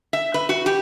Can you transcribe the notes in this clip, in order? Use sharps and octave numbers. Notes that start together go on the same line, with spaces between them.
E5
B4
F#4
G4